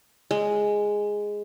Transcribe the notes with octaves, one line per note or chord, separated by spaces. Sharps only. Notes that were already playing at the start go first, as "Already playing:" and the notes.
G#3